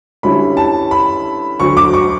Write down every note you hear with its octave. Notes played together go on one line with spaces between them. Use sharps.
G2 D3 G3 C#4 E4 B5
A5
B5
D2 D3 F#3 C#6
D6
C#6